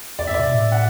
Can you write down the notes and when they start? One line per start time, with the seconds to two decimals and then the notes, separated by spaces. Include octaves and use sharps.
0.19 E2 D5
0.27 G2 E5
0.34 D5
0.39 B2
0.50 A2
0.72 F#5